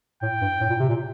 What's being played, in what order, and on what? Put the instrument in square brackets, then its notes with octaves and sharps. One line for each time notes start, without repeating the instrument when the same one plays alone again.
[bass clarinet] A2 [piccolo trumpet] G5
[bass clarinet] G2
A2
A#2
C3
A#2